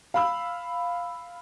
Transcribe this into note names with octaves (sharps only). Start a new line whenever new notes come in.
F5 B5 E6